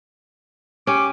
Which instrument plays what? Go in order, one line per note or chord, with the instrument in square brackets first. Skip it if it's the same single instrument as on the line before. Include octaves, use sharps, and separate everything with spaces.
[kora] C#4 G4 [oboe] D6